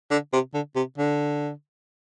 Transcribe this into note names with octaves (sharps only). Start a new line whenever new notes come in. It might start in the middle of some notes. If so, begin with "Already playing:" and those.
D3
C3
D3
C3
D3